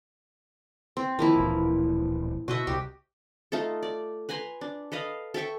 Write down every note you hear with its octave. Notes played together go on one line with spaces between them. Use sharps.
C4
D#3 F3 A#3 E4
D1 A#1 E3
B2 F#4 D#5 E5
C2 G4
A3 D#4 F4 A4
D5
B4 G#5 A#5 C6
D4
A4 B4 D#5 F5
A4 E5 G5 C#6